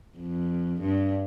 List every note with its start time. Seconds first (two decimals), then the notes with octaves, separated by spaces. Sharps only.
0.17 F2
0.81 G2